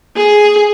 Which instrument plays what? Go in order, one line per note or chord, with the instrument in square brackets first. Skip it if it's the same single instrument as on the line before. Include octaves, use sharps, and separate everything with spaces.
[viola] G#4